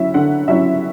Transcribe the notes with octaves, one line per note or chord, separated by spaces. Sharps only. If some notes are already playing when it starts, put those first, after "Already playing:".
Already playing: F#3 C#4 E4 E5
D3 F#5
F#3 C#4 E4 E5